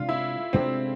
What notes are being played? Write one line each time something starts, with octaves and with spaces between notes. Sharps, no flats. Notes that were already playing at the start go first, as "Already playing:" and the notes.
Already playing: C3 G#3 D4 F4
E4
C3 G#3 C4 D4